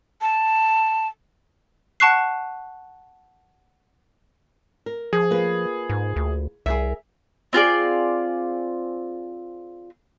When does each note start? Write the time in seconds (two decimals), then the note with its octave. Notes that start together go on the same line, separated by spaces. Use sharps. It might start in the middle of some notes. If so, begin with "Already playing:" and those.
0.21 A5
2.00 F#5 A5 C#6 F#6 C7
4.86 A#4
5.13 F3 G#4
5.31 A#3 F4 B4
5.89 G#2
6.16 D2
6.66 C2 G#4 A#4 E5
7.53 C4 F4 G#4 D5